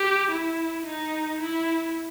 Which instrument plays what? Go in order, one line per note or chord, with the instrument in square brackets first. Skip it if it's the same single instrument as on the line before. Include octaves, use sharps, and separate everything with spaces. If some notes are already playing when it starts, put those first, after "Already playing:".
Already playing: [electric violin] G4
E4
D#4
E4